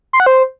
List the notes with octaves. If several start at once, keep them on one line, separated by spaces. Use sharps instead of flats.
C6
F#5
C5